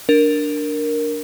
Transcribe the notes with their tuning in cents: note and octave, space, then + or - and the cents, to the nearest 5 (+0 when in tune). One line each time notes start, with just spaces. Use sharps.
D4 +0 A#4 +0